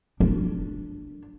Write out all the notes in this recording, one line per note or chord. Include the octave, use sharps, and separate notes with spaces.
D4